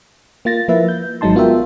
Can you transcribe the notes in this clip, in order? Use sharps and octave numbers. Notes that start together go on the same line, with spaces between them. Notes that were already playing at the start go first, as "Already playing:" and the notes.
A#3 F4 A6 A#6
F3 A#3 E4 B4 E5
G6
G#1 F#3 G#3 D#4 A5 C6
B3 F4 F#4 A#4 E5 G5